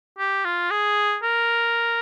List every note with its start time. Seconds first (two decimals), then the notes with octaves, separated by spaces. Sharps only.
0.19 G4
0.45 F4
0.71 G#4
1.23 A#4